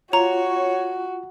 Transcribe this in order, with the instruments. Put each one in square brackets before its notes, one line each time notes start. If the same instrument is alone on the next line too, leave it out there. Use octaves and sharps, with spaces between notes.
[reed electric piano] F4 [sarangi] F#4 [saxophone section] C#5 [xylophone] A#5